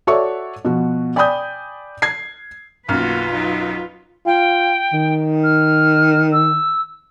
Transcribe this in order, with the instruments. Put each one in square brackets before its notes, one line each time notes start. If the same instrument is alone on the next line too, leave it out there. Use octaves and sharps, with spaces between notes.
[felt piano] F#4 A4 C#5 D5 E5 C#6
B2 F3 F#4
D5 G5 G#5 B5 D#6 G6
G#6 C7
[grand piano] B1 F#2 F6 [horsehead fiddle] A#3 F#4 [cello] F4 B4
[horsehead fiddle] F#3 D#4
[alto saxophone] F4 [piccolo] G5
[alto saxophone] D#3
[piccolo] F6
E6